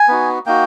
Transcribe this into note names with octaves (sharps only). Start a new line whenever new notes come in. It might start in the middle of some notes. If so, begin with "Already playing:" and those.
Already playing: G#5
B3 D#4 F#4
A#3 D#4 F#4 G5